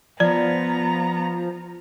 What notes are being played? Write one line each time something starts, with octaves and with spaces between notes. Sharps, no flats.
F3 B3 D5 A#5